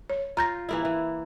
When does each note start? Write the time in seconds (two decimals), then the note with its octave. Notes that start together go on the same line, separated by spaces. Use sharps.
0.10 C#5
0.37 F4 A#5 G6 A#6
0.69 E3 A#3 E4
0.85 E3